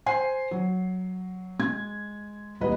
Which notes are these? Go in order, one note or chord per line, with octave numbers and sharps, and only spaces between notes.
C5 G#5 C7
F#3
G#3 G#6
D#1 C2 B4 D#5